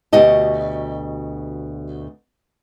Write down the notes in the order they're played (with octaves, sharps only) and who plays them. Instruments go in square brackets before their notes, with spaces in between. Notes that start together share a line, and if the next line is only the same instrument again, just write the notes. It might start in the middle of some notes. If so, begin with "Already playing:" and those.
[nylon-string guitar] D2 B2 G4 D#5 A5